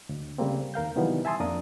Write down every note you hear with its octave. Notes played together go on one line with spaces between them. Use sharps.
D2
C#3 G3 A3 A#3 C4
D#2 A#4 F5 G6
C3 D#3 E3 F#3 G3 B3
E5 G#5 A5 C6 D#6 E6
F2 A#3 D4 A#4 D5 D#6